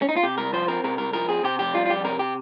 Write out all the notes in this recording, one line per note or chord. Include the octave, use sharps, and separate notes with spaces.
C#4
D#4
F4
C3 G4
C2 A#4
F3 C5
C4 A#4
C3 A#4
C2 A#4
F3 A#4
C4 G#4
C3 G4
F2 G4
G3 F4
F4
F2 G4
C3 A#4
G4